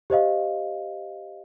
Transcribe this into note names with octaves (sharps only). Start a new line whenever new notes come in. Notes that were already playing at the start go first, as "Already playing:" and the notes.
G4 C5 D#5 F5